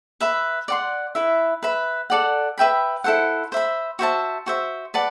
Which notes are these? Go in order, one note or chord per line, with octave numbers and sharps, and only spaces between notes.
B4 E5 B5
D5 F#5 C6
E4 B4 E5
B4 E5 B5
A4 D5 F#5
B4 E5 G5 B5
E4 A4 C5 F#5
C5 E5 B5
F#4 C5 E5 A5
F#4 C5 E5
B4 D5 F#5 A5